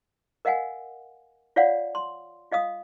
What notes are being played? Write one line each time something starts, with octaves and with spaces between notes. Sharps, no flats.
A#4 D#5 F5 F#5 G#5
F4 C#5 D5 F5 F#5
C6
F4 D#5 F5 D#6